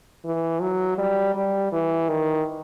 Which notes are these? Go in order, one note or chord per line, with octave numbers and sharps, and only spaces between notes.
E3
F#3
G3
G3
E3
D#3